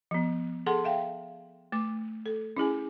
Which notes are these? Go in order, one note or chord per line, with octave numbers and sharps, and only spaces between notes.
F3 B3
G#4 A4 F#5 A5 C6
E5 F5 G5
A3 D6
A4
C#4 E4 G#4 G#5